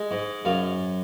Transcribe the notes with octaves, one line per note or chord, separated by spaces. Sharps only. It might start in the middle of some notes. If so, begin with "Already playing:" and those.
Already playing: G#3
G#2
F#2 F5